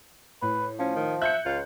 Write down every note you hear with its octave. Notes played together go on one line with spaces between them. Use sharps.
A2 B4
F3 C#4
D#3
E5 F#6 G6 C#7
C#2 F4